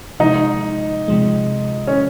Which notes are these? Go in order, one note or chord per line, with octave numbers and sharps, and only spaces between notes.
C3 F3 G#3 D#4
C3 F3 G#3
C#4